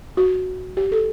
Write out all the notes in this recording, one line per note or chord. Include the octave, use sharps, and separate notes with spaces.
F#4
G4
A4